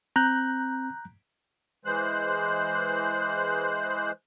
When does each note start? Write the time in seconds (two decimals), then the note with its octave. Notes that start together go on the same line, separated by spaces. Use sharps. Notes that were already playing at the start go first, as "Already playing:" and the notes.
0.16 C4 A#5 F#6 G6
1.85 E3 G#3 C5 F#6